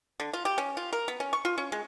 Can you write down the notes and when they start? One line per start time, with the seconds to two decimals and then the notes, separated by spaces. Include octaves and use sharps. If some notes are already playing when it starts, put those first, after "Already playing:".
0.20 D3
0.33 F4
0.45 G4
0.58 C#4
0.77 F4
0.93 A#4
1.08 B3
1.20 C#4
1.33 C#6
1.45 F4
1.58 C#4
1.72 G#3